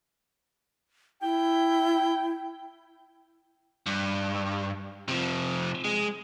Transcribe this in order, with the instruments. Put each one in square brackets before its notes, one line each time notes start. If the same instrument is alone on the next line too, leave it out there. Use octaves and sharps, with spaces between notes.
[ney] E4 [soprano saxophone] G5
[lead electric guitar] G2
C3 F3
G#3